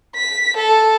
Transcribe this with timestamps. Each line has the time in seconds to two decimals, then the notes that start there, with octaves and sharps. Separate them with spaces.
0.16 B6
0.56 A4